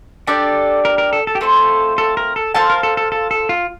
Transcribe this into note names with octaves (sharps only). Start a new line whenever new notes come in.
D4 G4 A4 D5
A#4
A#4
A4
A4
G4
A3 C4 F4 A4 C5
A4
A#4
A4
F4 A4 C5 F5 A5
A#4
A4
A4
A4
A4
F4